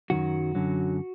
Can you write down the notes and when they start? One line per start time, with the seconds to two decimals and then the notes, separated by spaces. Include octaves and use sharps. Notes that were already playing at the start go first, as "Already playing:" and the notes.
0.10 F#2 D#3 F#3 F#4
0.55 F#2 D3 F#3